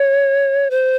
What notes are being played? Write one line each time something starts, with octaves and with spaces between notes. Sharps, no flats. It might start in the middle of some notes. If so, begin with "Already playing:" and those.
Already playing: C#5
C5